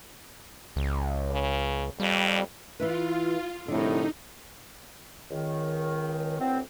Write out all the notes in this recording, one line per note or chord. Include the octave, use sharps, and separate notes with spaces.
C#2
C#3
F2 G3
E3 E4 F4 B4
C2 F2 A2 D3 D#4
C#2 D#3
D2 A2 B3 C4